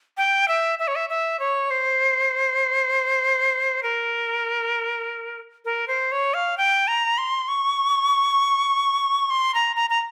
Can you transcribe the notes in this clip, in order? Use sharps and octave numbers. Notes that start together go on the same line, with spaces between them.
G5
E5
E5
C#5
E5
E5
C#5
C5
A#4
A#4
C5
C#5
F5
G5
A#5
C6
C#6
C6
A#5
A#5
A#5